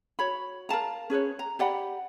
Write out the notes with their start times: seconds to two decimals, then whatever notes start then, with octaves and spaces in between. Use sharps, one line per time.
0.19 F#4 C#5 B5
0.69 A#4 F5 A5 A#5
1.10 C#4 G#4 B4 C#5
1.39 A#5
1.59 G4 D5 F#5 B5